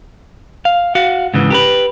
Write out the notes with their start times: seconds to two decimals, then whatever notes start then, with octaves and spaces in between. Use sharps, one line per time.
0.65 F5
0.95 F#4 F5
1.34 G#2 C#3 E3
1.50 G4 A#4 B4